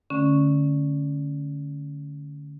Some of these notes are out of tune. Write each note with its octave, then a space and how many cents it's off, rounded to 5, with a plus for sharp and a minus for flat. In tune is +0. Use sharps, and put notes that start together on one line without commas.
D3 +0 A3 -5 C#4 +0